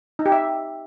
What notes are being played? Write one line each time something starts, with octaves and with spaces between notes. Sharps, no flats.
D#4
G4
E5